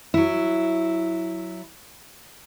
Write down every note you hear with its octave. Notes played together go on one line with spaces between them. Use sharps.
F#3 E4